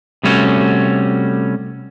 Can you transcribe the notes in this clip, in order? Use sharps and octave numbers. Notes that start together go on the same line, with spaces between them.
C3 G3 A3 C#4 F#4